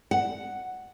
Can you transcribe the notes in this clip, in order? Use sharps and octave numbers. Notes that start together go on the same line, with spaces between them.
F#5